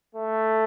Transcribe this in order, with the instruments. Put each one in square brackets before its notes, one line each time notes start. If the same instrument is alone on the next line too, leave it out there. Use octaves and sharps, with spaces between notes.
[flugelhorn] A3